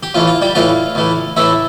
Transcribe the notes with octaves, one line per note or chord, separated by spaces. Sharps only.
G4
A2 E3 A3 F4
F4
G3 G4
A2 E3 A3 F4 F5
A2 E3 A3
A2 E3 A3 E4 E5